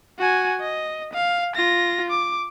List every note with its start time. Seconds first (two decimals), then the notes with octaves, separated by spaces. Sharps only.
0.19 F#4 G#5
0.61 D#5
1.14 F5
1.56 F4 A#6
2.10 D6